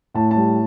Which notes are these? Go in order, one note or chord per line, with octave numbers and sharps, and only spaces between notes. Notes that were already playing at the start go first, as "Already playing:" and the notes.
A2 A5
A5
G3